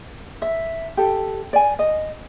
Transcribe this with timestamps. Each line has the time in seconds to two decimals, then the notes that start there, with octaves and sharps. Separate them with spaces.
0.42 E5
0.97 G4 A4
1.53 D5 G#5
1.79 D#5